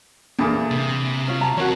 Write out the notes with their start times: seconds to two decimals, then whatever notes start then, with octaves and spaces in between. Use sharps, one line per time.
0.39 E2 A#2 D3
0.71 C3
1.28 C#4 F4
1.41 G5 A5 A#5
1.57 F3 C4 F#4 A#4 C#5